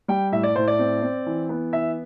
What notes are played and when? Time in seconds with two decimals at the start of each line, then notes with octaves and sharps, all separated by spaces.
0.08 G3 G5
0.32 A2 E5
0.43 D5
0.56 A2 C5
0.68 D5
0.79 C4
1.02 C4
1.26 E3
1.49 B3
1.73 E3 E5